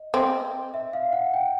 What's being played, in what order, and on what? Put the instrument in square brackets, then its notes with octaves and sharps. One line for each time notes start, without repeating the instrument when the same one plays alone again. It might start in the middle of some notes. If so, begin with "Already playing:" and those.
Already playing: [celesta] D#5
[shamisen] C4
[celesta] E5
F5
F#5
G5